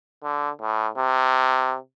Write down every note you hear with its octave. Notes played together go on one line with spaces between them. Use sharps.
D3
A2
C3